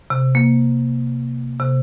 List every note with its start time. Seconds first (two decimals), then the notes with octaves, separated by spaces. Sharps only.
0.10 C3
0.35 A#3
1.60 C3